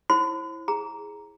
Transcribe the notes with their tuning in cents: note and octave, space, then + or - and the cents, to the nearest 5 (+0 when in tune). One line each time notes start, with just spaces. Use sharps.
E4 +0 C5 +40 B5 +40
G#4 +0 A#5 +5